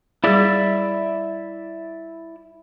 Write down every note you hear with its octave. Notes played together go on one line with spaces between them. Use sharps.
G3 E4 G#4 D5 E5